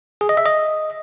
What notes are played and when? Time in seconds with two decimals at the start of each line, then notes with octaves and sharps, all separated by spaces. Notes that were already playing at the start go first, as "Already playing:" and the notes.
0.21 G#4
0.29 D#5
0.37 E5
0.46 D#5